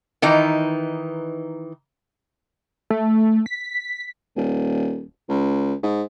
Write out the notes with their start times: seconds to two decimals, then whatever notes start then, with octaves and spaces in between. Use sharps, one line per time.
0.22 D#3 E3 D#4 A#5
2.90 A3
3.46 B6
4.36 D#1
5.29 C#2
5.83 G#2